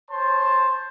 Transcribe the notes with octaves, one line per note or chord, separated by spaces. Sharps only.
C5 C#5 A5 C6